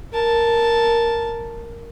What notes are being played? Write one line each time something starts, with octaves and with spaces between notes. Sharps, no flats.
A#4 A5